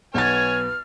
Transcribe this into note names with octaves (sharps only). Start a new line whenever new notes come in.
B1 B4 C#5 F#5 G#5 F6 A6